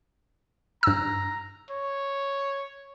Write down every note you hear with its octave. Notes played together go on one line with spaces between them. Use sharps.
G2 A#5 E6
C#5